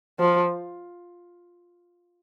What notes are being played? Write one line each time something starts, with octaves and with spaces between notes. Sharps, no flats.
F3